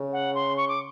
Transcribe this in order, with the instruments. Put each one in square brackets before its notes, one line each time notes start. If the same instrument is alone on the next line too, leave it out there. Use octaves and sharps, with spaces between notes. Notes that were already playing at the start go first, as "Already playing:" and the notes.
Already playing: [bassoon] C#3
[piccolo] F#5
C6
C#6
D6